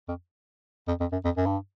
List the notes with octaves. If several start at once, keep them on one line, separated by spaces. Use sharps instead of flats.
F2
F2
F2
F#2
F2
F#2
G2